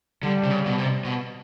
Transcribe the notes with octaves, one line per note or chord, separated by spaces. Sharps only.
D3 G3
C3
C#3
B2
C3
B2